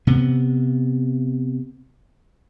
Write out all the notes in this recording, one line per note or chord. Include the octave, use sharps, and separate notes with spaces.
C3 B3